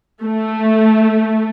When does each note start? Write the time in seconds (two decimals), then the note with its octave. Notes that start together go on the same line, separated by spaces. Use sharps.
0.24 A3